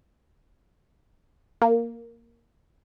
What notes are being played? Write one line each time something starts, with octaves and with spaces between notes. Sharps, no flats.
A#3